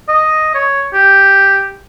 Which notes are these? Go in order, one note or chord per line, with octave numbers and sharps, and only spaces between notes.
D#5
C#5
G4